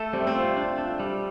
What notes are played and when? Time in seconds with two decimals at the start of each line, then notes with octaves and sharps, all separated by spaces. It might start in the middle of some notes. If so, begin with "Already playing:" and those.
Already playing: A3 A4
0.13 G3 C4
0.20 A3
0.27 C4
0.35 F4
0.57 D4
0.78 A4
1.00 G3